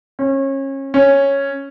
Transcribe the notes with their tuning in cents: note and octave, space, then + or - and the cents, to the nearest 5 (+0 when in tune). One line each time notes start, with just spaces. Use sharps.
C#4 -30
C#4 -5